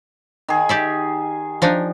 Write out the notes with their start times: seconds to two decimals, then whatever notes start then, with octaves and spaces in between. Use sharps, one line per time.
0.48 D#3 G#4
0.69 G4 D5 E5
1.62 F3 D4 D#4